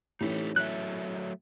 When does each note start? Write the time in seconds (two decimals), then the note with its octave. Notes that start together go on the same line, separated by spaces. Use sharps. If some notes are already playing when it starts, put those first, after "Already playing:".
0.21 A2 E3 C#4 D#4 G4 A4
0.56 F#3 A3 E5 F#6